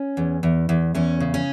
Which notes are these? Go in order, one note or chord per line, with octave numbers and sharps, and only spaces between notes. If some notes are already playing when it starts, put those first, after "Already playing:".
Already playing: C#4
E2
E2
E2
E2 C#4
C#3
C#4